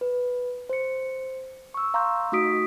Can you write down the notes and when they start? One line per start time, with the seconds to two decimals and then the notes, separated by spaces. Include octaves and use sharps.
0.01 B4
0.69 C5 C#7
1.74 C#6 E6
1.94 F5 A#5 C6 C#6 E6 G6
2.32 A3 D#4 F#4 D#6 B6 D7